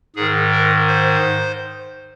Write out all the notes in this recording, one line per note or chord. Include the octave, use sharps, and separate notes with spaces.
G#2 D#3 G#4
A#4
C5